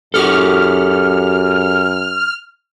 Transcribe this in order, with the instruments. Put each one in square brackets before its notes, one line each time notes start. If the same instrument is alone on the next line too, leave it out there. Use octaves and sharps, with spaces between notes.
[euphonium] F#2 [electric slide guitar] F#4 G4 A4 [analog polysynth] F6